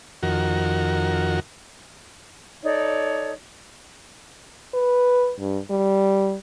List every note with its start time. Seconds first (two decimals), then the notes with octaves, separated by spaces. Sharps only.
0.23 F2 D#3 F#4 A#4
2.63 D#4 A4 C#5 D5
4.74 B4
5.40 G2
5.70 G3